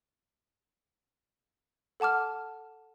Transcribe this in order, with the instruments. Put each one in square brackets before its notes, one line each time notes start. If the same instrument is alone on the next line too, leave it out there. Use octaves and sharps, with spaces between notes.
[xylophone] A4 F#5 A5 D6 F6